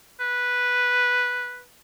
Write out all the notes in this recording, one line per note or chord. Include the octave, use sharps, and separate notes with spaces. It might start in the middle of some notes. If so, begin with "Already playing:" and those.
B4